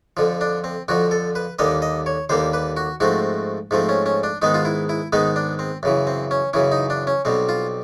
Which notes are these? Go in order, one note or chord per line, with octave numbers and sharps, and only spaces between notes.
F2 D3 F3
D4
C4
F2 D3 F3 F#4
A4
B4
D#2 D3 G3 A#3 D#5
D#5
C#5
D#2 D3 G3 A#3 C5
B4
F#4
G#2 F3 A3 C4 F#4
G#2 F3 A3 C4
C#4
C#4
D4
G#2 D#3 G#3 B3 D#4
F4
E4
E4
G#2 D#3 G#3 B3 D#4
D4
C4
F#2 C#3 E3
C4
C#4
F#2 C#3 E3 C#4
D#4
D4
C#4
B1 B2 G3 C4
F4